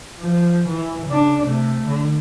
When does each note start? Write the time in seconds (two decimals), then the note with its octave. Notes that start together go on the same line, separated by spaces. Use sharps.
0.19 F3
0.69 E3
1.06 C#3 D4
1.45 C3 A3
1.86 D3